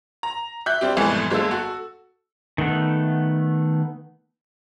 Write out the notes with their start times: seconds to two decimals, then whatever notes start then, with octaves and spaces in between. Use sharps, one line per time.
0.23 A#5
0.66 E5 F#6 G6
0.81 G3 C4 G4
0.97 C2 F2 G#2 B2 E3 A3
1.31 G1 G#3 A#3 A4 E6
1.51 F#4 A4
2.58 D#3 A3 B3